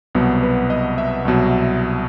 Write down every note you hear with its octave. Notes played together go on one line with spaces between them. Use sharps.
C2 B2 F#3 B3
B4
D#5
E5
C2 B2 F#3